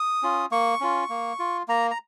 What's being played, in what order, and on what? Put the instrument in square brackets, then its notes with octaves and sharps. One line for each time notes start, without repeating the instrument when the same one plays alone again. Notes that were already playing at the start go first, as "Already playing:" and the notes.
Already playing: [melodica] D#6
C#4 F4
A#3 C#6
C#4 F4
A#3
F4
A#3 A#5
A#5